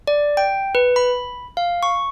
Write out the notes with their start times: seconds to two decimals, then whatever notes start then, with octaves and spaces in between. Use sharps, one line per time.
0.07 D5
0.37 G5
0.75 B4
0.96 B5
1.57 F5
1.83 C#6